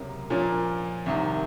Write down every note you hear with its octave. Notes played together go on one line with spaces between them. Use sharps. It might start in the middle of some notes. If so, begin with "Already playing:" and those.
Already playing: C#2 C3 F#3 A#3
A#2 F3 A#3 C#4
C2 C3 D#3